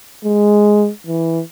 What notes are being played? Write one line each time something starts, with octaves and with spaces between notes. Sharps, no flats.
G#3
E3